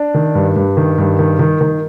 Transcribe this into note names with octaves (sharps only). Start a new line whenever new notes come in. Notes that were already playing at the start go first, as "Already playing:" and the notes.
Already playing: D4
D#3
G2
G2
D#3
G2
D#3
D#3
D#3